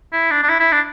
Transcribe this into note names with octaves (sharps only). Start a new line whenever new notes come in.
E4
D4
D4
E4
E4
D4